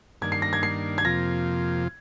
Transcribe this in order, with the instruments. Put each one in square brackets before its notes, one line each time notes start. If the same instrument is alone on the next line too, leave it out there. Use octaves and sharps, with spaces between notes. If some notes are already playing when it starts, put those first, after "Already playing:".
[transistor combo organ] G2 D#3 A#3 D4 [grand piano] G#6
[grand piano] C7
A#6
G#6
C7
G#6
[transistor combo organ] F2 C3 F3 A#3 F4 [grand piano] A#6